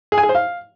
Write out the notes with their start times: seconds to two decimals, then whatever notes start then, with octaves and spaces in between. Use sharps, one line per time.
0.12 G#4
0.18 G#5
0.23 G#4
0.29 C5
0.35 F5